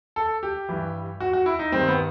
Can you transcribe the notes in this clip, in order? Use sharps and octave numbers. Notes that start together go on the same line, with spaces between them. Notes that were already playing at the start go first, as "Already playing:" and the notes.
A4
G4
G2 E3 G3
F#4
F#4
E4
D#4
G2 D#3 G3 C4
B3